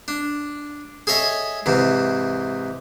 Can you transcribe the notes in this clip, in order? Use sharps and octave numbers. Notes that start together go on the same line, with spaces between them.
D4
G#4 A4 C#5 D#5 E5
G#2 C3 E3